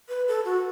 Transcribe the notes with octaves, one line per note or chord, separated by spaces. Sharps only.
B4
A4
F#4